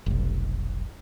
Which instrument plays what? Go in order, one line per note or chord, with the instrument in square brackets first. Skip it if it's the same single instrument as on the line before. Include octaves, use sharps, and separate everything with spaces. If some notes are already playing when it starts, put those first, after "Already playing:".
[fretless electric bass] F1 B1